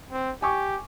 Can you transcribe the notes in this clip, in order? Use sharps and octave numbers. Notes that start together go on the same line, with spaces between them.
C4
G4 G#5 C#6 D6